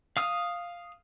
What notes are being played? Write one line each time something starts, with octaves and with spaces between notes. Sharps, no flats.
F5 D#6 F6